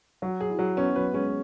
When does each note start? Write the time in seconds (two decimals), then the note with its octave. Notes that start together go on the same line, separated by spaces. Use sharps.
0.22 F#3 F#4
0.41 G#4
0.50 E4
0.59 F#3
0.77 B3 C#4
0.96 F#3 B4
1.14 G#3 C#4